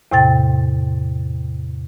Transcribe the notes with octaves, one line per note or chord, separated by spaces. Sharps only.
E2 A2 C3 G5 A6